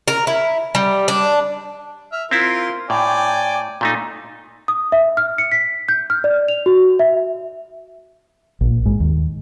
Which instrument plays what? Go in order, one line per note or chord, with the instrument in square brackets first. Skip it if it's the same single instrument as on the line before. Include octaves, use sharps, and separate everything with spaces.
[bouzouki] A#4
E4
G3
D4
[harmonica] E5 F6
[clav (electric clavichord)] C4 E4 [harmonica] F4 A#4 C6
[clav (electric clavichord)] A2 [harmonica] D5 G5 G#5
[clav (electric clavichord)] A#2 A3 D#4
[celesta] D#6
E5
F6
C#7
B6
G6
F6
D5
F7
F#4
E5
[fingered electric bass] A#1
G#2
D#2